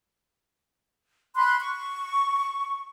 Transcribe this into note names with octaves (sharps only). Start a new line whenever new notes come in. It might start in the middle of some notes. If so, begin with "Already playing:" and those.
B5 C6 F#6
C#6